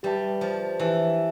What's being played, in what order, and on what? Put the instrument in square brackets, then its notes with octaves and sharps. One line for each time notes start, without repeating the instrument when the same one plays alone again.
[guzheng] G3 [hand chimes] G4 B4 E5 A5
[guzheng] F3
[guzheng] E3 [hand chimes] G4 B4 E5 A5